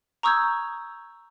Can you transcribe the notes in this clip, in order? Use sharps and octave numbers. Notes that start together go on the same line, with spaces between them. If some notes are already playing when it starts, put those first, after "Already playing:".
A#5 C#6 D#6 E6 G6 G#6